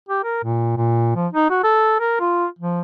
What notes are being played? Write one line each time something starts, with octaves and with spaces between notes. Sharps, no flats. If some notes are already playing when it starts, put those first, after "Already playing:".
G4
A#4
A#2
A#2
F3
D#4
F#4
A4
A#4
F4
F3